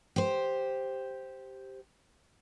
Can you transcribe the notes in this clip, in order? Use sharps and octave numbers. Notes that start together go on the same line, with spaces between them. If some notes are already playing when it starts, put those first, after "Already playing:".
G4 C5